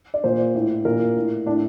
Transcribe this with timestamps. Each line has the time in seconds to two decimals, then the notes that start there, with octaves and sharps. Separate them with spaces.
0.14 D5
0.24 A#2 C5
0.55 A2
0.85 A#2 A#4
1.16 A2
1.46 A2 D4